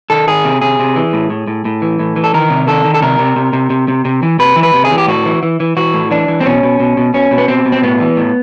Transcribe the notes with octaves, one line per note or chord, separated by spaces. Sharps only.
D#3 A4
D#3 G#4
C3
C3 G#4
C3
E3
A2
A2
A2
A2
E3
A2
E3
A4
D#3 A#4
C3
D#3 A4
D#3
A4
C3 A#4
C3
C3
C3
C3
C3
C3
E3
C3 B4
E3
B4
C3
G#4
E3
G4
A2 F#4
E3
E3
E3
E3 F#4
A2
E3 D4
E3
C4
B2 C#4
B2
B2
B2
B2 C#4
B2
B3
B2 C4
B2
C4
A2 B3
E3
A2